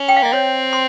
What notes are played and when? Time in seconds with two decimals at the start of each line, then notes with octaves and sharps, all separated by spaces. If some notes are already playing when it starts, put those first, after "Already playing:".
Already playing: C#4
0.08 G5
0.16 F5
0.23 A#3 D#5
0.32 C4 C#5
0.73 C6